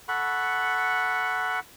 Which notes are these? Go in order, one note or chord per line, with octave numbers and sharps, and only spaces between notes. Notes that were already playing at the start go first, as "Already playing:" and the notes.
A4 F#5 B5 C#6